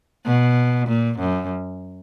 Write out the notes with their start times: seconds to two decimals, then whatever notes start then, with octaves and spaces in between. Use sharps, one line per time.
0.25 B2
0.88 A#2
1.19 F#2